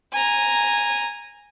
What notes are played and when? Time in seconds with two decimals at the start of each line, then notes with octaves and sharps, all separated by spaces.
0.13 G#5 A#5